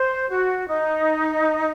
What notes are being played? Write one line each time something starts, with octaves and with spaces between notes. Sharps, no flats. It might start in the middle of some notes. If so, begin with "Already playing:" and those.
Already playing: C5
F#4
D#4